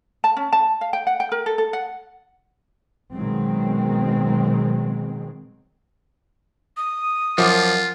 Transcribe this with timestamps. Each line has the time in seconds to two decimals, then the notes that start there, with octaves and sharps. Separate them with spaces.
0.24 A5
0.37 C#4
0.53 A5
0.81 F5
0.93 G5
1.07 F#5
1.20 G5
1.32 A#4
1.46 A4
1.58 A4
1.73 F#5
3.13 B2 D#3 F#3 G#3 C4
6.77 D#6
7.38 F#2 F3 F4 D6